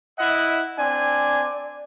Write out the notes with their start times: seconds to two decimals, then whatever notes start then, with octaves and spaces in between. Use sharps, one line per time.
0.19 E4 D#5 F#5
0.79 C4 D4 D5 G#5